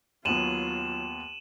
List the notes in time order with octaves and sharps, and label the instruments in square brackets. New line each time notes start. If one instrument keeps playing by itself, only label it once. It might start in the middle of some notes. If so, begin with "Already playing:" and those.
[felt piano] D#2 B3 [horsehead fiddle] F#3 F4 [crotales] D#7 E7 F#7